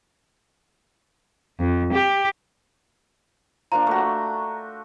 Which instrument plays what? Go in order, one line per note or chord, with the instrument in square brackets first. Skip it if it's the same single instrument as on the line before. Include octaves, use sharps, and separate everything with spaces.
[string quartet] F2
G4
[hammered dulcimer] F3 A#3 D4 [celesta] A#5
[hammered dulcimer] A3 F#4